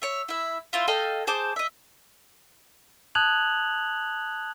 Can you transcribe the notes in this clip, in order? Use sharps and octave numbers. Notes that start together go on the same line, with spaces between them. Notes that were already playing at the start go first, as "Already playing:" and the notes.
C#5 E5
E4 E5
E4 F4 C5
A4 D#5 F5 G5
G#4 C5 A5 D6
D#5 E5
A5 D#6 F#6 G#6 F7 F#7